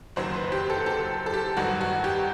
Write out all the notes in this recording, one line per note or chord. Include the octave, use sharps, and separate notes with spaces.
F#1 F#2 D#3 F#3 C5
B4
G4
A4
A4
A4
G4
A1 G2 D#3 F#3 F#4
F#4
G4